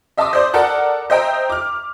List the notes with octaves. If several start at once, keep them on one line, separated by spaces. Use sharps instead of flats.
D#5 E5 A5 C6 D6 D#6
C5 D5 C6
A4 A#4 D5 F#5 A5 F#6
C5 D#5 E5 G5 A#5
D6 F6